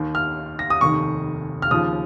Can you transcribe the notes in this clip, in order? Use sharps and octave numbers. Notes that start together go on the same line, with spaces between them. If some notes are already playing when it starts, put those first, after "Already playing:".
Already playing: D#2 D#3
F6
A#6
D#6
F1 D#2 D#3 C#6
F6
D#2 C#3 F3 D#6